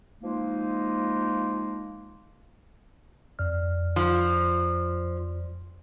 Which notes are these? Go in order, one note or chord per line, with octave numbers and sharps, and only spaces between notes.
F3 G#3 A#3 D#4
F2 D5 F6
F3